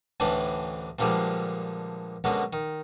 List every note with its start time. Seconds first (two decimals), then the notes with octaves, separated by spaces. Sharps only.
0.20 A1 D2 A2 E3 D4 B4
0.99 G2 A#2 D3 F3 G3 G#3
2.24 F#2 B2 D3 G#3
2.53 D#3